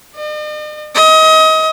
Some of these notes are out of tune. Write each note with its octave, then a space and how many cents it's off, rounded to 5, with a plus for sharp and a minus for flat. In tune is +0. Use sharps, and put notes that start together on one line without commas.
D#5 -45
D#5 +30